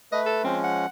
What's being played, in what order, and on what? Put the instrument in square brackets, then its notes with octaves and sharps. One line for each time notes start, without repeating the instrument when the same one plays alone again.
[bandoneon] A3 B4 [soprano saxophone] D#5
[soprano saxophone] A4
[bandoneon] F3 G#3 C#4 [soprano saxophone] C4
[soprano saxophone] F#5